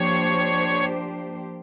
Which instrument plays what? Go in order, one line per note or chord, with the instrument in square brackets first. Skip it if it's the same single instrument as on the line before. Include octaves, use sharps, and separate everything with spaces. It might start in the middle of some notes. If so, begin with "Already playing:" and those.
Already playing: [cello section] F3 A#3 D4 G4 C5 [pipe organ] C#5